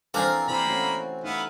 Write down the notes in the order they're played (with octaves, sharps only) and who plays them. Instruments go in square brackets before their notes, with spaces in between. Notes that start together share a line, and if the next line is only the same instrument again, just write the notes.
[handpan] E3 A4 [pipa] F3 D4 A#4 [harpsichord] C4 G#5 D6
[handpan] C3 E4 C5 [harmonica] A#3 A#5 B5
[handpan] A3 C#4 F#4
[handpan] A3 D#4 [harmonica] B3 E4 F5